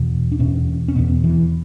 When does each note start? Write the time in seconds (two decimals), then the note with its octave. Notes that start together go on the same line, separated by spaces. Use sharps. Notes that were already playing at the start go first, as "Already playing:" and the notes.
Already playing: E2 B2
0.32 D4
0.39 E2 B2 C#4
0.88 C#4
0.95 E2 B2 B3
1.24 E3